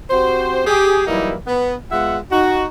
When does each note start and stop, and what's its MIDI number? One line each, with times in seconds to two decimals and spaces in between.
0.11 0.64 60
0.11 0.64 66
0.11 0.64 67
0.11 0.64 72
0.67 1.05 67
0.67 1.05 68
1.07 1.35 52
1.07 1.35 54
1.07 1.35 55
1.07 1.35 58
1.07 1.35 63
1.07 1.35 64
1.47 1.75 59
1.91 2.18 56
1.91 2.18 59
1.91 2.18 65
1.91 2.18 76
1.91 2.18 78
2.32 2.66 63
2.32 2.66 66